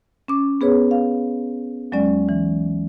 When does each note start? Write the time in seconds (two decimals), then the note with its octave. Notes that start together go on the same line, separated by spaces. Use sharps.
0.28 C#4 D6
0.61 B3 G#4 B4 C#5
0.91 F5
1.92 D#2 F#3 G#3 C#4 D5
2.29 E3